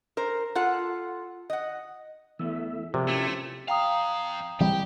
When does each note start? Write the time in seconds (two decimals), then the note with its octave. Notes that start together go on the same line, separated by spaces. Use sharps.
0.17 A#4 C5
0.55 F4 A4 F#5
1.50 D#5 F#5
2.39 E3 A3 B3 E4 E5
2.94 C3 F3 C4 F#4 G#4 A#4 D5
3.08 A3 C#4 E4 F4 G#5 E6
3.68 F2 F5 G5 A#5 D#6
4.60 E3 G3 C4 G4